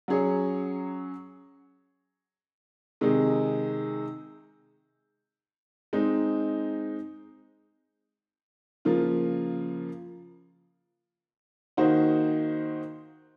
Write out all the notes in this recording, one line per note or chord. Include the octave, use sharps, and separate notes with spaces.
F#3 C#4 G#4 C#5
C3 D#3 G#3 D#4 G#4
G#3 C4 D#4
C#3 F3 A#3 F4
D#3 A#3 D#4 F#4 C5